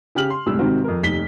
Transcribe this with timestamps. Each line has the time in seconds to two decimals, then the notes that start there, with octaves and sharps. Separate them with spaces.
0.15 C#3 G4 F6 F#7
0.30 C6
0.46 C#2 A2 C3 G3 E6
0.59 G#2 C3 D#3 C4 F#4
0.84 F2 A#4
1.02 F1 D#2 D#4 B6 G7